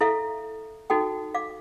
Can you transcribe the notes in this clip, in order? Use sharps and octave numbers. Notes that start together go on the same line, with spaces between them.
E4 A4 E5 F5
D#4 F#4 A4 G5
F5 D6